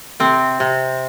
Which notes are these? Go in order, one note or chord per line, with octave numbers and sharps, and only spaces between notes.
C3 C4
C3